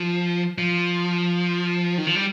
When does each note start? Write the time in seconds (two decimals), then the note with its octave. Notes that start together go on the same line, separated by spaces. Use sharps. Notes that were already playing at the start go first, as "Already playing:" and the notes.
Already playing: F3
0.58 F3
1.98 D#3
2.07 F3
2.15 G3